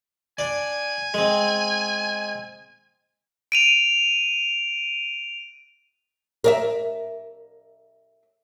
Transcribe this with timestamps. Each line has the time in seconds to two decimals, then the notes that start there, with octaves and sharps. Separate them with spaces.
0.39 D4 D5 G#5
1.14 G#3 C4
3.52 D7 D#7 F7
6.44 A#4 D5 E5